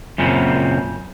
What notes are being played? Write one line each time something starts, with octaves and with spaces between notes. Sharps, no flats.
F#2 A#2 C#3 C4